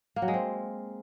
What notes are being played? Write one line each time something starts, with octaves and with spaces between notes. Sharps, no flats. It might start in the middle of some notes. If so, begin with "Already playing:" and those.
A#3
F#3
G#3
C4